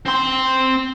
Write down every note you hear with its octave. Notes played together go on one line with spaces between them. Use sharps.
C4 C6